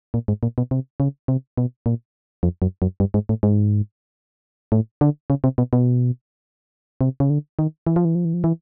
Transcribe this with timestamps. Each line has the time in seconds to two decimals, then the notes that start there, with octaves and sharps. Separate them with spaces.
0.14 A#2
0.28 G#2
0.43 A#2
0.58 B2
0.71 C3
1.00 C#3
1.28 C3
1.58 B2
1.86 A#2
2.43 F2
2.62 F#2
2.82 F#2
3.00 G2
3.14 G#2
3.29 A2
3.43 G#2
4.72 A2
5.01 D3
5.30 C#3
5.44 C3
5.58 B2
5.73 B2
7.01 C3
7.20 C#3
7.30 D3
7.59 D#3
7.87 E3
7.96 F3
8.05 E3
8.15 F3
8.25 E3
8.34 F3
8.44 E3